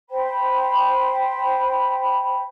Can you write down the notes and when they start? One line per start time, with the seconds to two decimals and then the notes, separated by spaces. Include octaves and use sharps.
0.10 C5 G5 B5